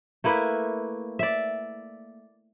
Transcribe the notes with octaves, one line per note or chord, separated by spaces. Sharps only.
A3 A#3 E4 B4
D5 E5